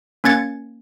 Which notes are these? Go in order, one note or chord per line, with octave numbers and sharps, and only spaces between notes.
A#3 C#4 G#6 A6 C#7